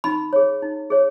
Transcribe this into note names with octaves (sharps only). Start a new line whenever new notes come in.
D#4 B5
G#4 C#5
D#4
G#4 C#5